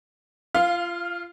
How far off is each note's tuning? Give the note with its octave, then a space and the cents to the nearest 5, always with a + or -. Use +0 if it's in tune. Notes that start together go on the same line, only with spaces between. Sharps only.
F4 -25 F5 +0